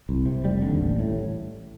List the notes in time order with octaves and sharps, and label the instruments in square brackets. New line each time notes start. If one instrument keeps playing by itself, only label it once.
[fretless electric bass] C2
C3
F1 G3
D#2 D3
A1
A2